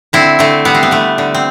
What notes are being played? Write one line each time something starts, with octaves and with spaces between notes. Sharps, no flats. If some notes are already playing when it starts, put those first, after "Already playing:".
D3 C4 E4
D3 A3 C4
G3 B3
C4
B3
D3 A3
D3
C4